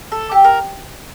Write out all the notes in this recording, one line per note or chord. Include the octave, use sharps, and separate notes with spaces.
A4
G4
A#4